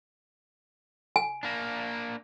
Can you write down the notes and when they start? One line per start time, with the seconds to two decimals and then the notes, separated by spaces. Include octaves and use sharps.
1.16 G#5
1.43 A#3 D4